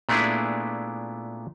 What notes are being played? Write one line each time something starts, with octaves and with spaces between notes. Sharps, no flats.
A#2 A3 B3 D4 E4 G#4